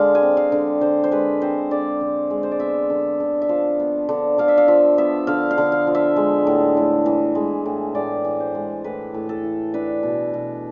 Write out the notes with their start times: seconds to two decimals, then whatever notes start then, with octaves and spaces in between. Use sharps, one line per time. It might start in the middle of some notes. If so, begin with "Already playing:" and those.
Already playing: D3 G#3 F5
0.15 G#5
0.22 C4
0.37 F5
0.52 D3
0.81 D3 C5
1.04 C5
1.11 G#3 B4
1.42 C4 C5
1.71 D3 D5
2.01 D3
2.30 G#3
2.43 C5
2.52 D5
2.60 B3 E5
2.90 D3
3.20 D3
3.42 E5
3.49 F3 F5
3.80 B3
4.09 D3
4.38 D3 F5
4.48 E5
4.58 F5
4.68 F3 E5
4.98 B3 E5
5.27 D3 F5
5.51 F5
5.58 D3
5.72 F5
5.87 F3
5.95 E5
6.16 G#3
6.47 A2
6.77 A2
7.06 E3
7.35 G#3
7.65 A2
7.95 A2 D5
8.25 E3
8.40 C5
8.55 G#3
8.84 A2 B4
9.14 A2
9.29 A4
9.43 E3
9.74 D4 B4
10.03 B2
10.34 B2